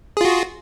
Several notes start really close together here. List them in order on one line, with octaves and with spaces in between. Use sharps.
G#4 F4 F#4